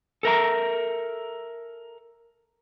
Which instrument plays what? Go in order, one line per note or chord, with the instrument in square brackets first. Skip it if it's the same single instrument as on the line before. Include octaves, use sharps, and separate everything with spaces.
[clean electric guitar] A4 A#4 E5 A#5